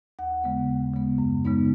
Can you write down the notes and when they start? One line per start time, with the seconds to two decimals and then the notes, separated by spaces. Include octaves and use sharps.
0.19 D#2 F#5
0.44 C#3 G#3 B3
0.69 D#2
0.93 C#3 G#3 B3
1.18 F#2
1.44 C#3 G#3 B3 D#4